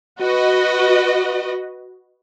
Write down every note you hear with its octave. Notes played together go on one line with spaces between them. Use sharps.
F#4 B4 D#5